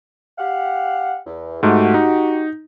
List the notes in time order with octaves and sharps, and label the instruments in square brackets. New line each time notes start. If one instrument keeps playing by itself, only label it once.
[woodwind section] G4 F5 F#5
E2
[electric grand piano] G#2 A3 [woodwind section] F#4 G4
[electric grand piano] D#4